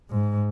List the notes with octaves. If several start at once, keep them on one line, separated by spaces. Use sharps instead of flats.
G#2